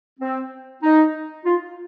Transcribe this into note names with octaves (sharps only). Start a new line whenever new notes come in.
C4
D#4
F4